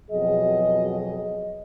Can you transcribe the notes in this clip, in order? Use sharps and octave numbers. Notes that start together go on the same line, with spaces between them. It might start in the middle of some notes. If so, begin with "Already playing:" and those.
F2 B2 F#3 G#4 D#5